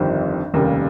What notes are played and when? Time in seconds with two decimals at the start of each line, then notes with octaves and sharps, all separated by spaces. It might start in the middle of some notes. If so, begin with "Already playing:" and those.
Already playing: G1 F2 D#3 G3 C4
0.54 F1 D#2 C#3 G3 A#3